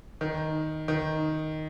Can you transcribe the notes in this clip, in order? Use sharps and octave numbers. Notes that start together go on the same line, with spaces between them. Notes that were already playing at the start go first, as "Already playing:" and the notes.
D#3
D#3